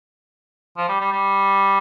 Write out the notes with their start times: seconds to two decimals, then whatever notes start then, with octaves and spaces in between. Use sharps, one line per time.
0.77 F3
0.89 G3
1.01 G3
1.12 G3